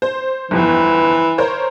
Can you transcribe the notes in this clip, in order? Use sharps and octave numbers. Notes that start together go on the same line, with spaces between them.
C5
G1 F2 E3 B3
A#4 C5 C#5